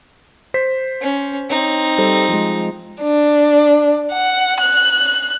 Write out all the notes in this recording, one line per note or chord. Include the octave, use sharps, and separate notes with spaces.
C5 B6
C#4
C4 D#4 C#5
G3 A4 C5
F3 G#3
D4
F#5
F#6